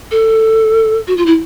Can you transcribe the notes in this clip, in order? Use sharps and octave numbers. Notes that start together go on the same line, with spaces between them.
A4
F#4
F4
E4